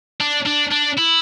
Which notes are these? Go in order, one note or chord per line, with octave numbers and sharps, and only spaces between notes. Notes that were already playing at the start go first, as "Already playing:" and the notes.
D4
D4
D4
E4